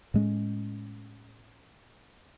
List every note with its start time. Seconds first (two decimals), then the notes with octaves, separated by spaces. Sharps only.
0.14 A2 G#3 C#4